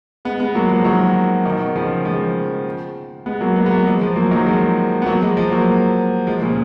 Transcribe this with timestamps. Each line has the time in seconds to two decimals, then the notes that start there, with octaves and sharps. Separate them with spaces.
0.25 G#3 B3
0.40 G#3 B3
0.55 F#3 A#3
0.70 F3 G#3
0.85 D#3 F#3
1.45 B2 D#3
1.76 C#3 F3
2.05 F3 G#3
3.26 G#3 B3
3.41 F#3 A#3
3.56 G#3 B3
3.66 B3
3.71 F#3 A#3
3.86 F3 G#3
4.01 F3 G#3
4.16 F#3 A#3
4.31 D#3 F#3
4.46 F3 G#3
5.02 B3
5.06 F#3 A#3
5.22 F3 G#3
5.36 F3 G#3
5.51 F#3 A#3
6.27 F3 G#3
6.42 A#2 C#3